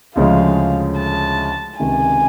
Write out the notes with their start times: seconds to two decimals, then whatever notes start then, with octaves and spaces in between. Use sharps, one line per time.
0.16 D2 C#3 F3 G#3 F5
0.98 A5
1.80 C#2 C3 D#3 G#5